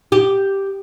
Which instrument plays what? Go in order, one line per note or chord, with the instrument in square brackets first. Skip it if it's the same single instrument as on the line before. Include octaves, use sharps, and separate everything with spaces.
[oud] G4